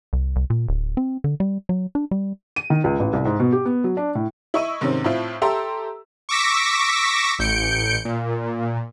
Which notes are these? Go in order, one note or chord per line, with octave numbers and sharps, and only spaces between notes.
C2
C2
A#2
D1
C4
D3
G3
F#3
D4
G3
D#7
D#3
C#2
A1
C2
G#2
B2
G4
B3
F#3
D4
A2
E4 D#5 C#6 E6 D#7
G#2 C3 D#3 C4 C#4
A2 C4 E4 F4
G4 A4 E5 A#5 C6 E6
C#6 D6 E6 A#6 B6
A1 G6 C#7 D7
A#2